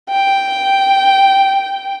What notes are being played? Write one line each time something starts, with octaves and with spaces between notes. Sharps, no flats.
G5